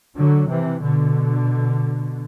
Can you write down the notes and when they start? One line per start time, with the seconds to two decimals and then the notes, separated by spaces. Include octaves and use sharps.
0.16 D3 F#3
0.49 C3 E3
0.82 B2 D3